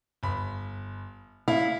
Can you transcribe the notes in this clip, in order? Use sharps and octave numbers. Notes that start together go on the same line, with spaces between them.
G1 B5
A2 E4 F5